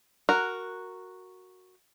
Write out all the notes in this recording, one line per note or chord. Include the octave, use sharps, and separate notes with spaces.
F#4 A#4